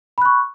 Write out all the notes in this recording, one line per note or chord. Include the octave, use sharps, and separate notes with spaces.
B5 C#6 F#6